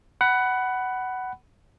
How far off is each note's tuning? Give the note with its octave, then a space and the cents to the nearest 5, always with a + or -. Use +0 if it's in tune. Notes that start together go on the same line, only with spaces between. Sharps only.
F#5 +15 B5 +0